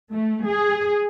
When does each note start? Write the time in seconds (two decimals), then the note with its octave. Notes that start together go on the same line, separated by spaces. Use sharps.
0.11 A3
0.45 G#4